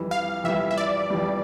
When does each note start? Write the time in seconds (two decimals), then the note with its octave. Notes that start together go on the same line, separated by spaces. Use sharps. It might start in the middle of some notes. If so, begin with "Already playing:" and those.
Already playing: F2 E3 G3
0.11 F5
0.44 F2 E3 G3 E5
0.71 E5
0.77 D5
1.10 F2 E3 G3